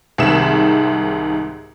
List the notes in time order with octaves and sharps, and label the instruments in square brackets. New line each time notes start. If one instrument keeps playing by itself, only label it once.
[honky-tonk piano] C2 G#2 D#3 G#3 E5 E7